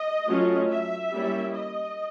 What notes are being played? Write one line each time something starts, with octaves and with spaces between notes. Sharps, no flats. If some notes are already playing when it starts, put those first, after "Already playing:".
Already playing: D#5
F#3 A3 C#4 F4
E5
G3 A#3 C#4 E4
D#5